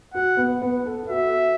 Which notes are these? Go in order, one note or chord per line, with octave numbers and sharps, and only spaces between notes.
F#4 F#5
B3
B3
A4
A4
F#4 E5